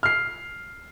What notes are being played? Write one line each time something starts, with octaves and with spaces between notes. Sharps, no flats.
F6 C7